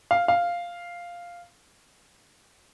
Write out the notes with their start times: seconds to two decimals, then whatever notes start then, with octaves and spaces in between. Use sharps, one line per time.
0.11 F5
0.28 F5